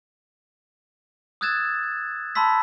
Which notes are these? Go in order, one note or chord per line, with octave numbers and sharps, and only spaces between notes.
D#6 E6 F#6 G#6 A6 E7
A5 B5 C6 E6 B6